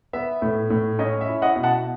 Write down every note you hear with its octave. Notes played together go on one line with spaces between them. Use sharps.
B3 E5
A2
A2
C#4 D#5
E5
E4
D#5 F#5
B2
F#5 A5